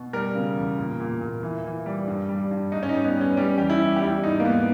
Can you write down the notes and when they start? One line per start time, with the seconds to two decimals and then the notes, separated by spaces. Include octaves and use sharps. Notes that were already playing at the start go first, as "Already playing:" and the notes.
Already playing: B2
0.13 G3 A#4
0.35 C#3
0.56 E2
0.78 A#2
1.00 A#2
1.21 A#2
1.43 E3
1.64 E3
1.86 G3
2.07 G2
2.29 G3
2.51 G2
2.72 G#2 D#4
2.83 C#4
2.89 D#4
2.94 G3
3.04 B3
3.15 G3
3.21 C#4
3.37 G3 C#4
3.58 E2 G4
3.70 E4
3.81 G3
3.96 G4
4.02 G3 E4
4.23 G#2 D#4
4.40 A#3
4.45 G#2 B3